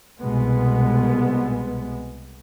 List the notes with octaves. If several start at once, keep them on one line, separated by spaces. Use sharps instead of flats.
C2 B2 G#3 B3